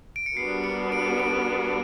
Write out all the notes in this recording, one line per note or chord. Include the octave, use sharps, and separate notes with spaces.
D7
C#7
G3 B3 D4 F#4 A#4 C7
C#7
D7
D7